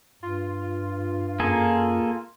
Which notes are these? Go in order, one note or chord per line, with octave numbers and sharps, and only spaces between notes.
G2 F4
F#2 A#3 G#4 A4